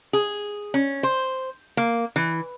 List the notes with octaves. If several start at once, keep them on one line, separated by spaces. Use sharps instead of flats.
G#4
C#4
C5
A#3
E3